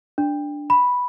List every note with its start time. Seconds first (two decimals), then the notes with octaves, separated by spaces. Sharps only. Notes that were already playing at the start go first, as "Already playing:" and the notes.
0.18 D4
0.70 B5